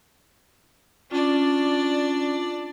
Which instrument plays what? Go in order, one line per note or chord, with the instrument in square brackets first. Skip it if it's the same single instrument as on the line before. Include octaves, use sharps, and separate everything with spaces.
[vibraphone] C#4 F4 [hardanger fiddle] D4 D5